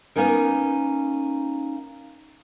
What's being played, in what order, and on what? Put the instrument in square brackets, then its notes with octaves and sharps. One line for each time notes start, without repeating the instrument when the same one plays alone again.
[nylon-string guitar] A#3 B3 C#4 D#4 A#4